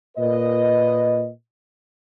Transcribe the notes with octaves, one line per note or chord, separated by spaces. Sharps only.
A#2 B4 D#5